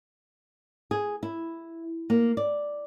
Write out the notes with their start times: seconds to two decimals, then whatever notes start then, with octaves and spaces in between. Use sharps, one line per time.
0.91 G#4
1.23 E4
2.10 A#3
2.37 D5